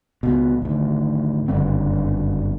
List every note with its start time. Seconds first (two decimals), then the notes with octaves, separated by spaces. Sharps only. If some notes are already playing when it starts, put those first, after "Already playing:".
0.23 C#2 B2
0.62 G#1 D2
1.48 F#1 G2 D3 C4